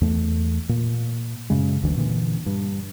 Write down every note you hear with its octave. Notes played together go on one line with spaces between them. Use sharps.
E2 A3
A#2
F#2 C#3 G#3
F#1 D2 D3 E3
A#2 D3 E3
G2